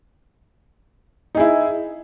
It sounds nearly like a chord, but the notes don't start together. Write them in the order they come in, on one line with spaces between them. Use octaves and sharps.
D#4 G#4 E4